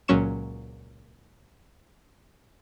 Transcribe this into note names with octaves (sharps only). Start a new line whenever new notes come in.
C#2 A#2 F#3 C#4 C#6 E7